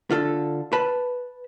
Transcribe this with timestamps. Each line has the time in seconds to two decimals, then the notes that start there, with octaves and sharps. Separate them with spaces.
0.11 D3 F4 A4
0.73 B4 A5 B5